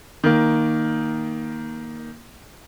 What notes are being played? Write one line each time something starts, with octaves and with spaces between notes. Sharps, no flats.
D#3 A#3